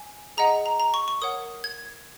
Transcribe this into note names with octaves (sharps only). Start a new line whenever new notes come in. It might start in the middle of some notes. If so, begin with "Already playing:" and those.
Already playing: G#5
G#4 D#5 F#5 A#5
A#5
A#5
C#6
C#6
A#4 C#5 F#5 D#6
G#6